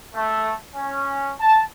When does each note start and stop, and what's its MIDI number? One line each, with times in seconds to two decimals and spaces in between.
0.14 0.52 57
0.75 1.32 61
1.40 1.60 81